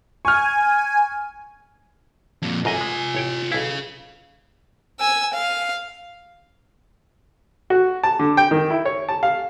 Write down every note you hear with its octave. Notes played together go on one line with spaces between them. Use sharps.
G#5 C#6 F6
F2 A#2
B1 F#2 F4 D#5 G#5
G#3
A1 C#5 G5
B1 E4 G#4 F5
G#5 E6
F5
F#4
A5
D3
G5
D#3
E4
C#5
A5
F5